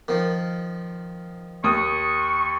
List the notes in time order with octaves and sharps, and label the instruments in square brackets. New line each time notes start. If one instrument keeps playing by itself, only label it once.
[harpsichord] D#3 F3
[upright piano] D#2 D#6 [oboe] C#6